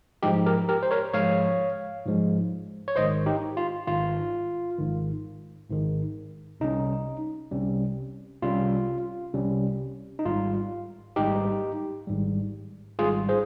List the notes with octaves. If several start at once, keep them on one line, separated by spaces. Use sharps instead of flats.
G#2 F3 G#3 D#4 G4
G4 A#4
G4 A#4
C5
A#4 C#5
G#2 F3 G#3 C#5 F5
G#2 F3 G#3
C#5
G#1 G#2 D#3 C5 D#5
D#4 G4
F4
G#1 G#2 D#3 F4
G#1 G#2 D#3
G#1 G#2 D#3
C2 C3 G3 C#4 D#4
C2 C3 G3 C#4
C2 C3 G3 C#4 F4
C2 C3 G3 C#4
D#4
G#1 G#2 G3 F4
G#1 G#2 G3 D#4 G4
G#1 G#2 G3
G#1 G#2 G3 F4 G#4
G#4 C5